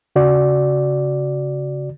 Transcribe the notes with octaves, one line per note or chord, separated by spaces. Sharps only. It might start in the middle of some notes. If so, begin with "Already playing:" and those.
C#3 F#4 D5